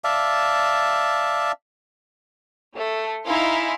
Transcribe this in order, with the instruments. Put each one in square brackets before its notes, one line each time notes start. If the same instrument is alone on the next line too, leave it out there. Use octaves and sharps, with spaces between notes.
[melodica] D5 E5 F5 A5
[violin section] A3
D#4 E4 F5 G#5 C6